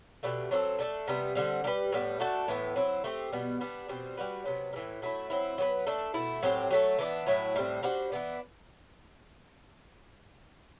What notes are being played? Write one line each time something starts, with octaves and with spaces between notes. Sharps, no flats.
B2 A3 D4 G4
F#3 C4 F#4 A4
A3 D4 A4
C3 G3 B3
D3 G3 C4
G3 D4 G4 B4
A2 G3 B3
A3 D4 F#4 A4
A2 E3 B3
F#3 C4 E4
A3 C4 G4
B2 G3 B3
G3 B3 D4
B2 G3 C4
G3 D4 F#4 B4
C3 F#3 B3
G3
A2 E3
F#3 A3 E4
F#3 C4 E4
F#3 B3 F#4 B4
A3 D4 A4
B2 A3 E4
A2 F#3 C4 G4
F#3 A3 E4 A4
E3 B3 D4
A2 F#3 A3 E4
A2 G3 C4
G3 D4 F#4 C5
E3 B3 D4